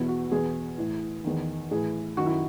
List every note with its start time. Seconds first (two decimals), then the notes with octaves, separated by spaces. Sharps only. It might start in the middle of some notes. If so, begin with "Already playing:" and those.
Already playing: E2 B2 E4
0.08 F#4
0.32 E2 B2 G#4
0.78 A2 E3
1.24 E2 D#3
1.71 A2 E3 G#4
2.17 F#2 D#3 F#4
2.26 E4